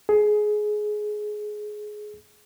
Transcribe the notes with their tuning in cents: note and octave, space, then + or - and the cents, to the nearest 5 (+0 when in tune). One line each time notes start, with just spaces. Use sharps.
G#4 +20